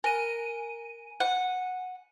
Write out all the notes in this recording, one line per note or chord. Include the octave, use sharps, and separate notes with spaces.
A#4 G#5 D#7
F#5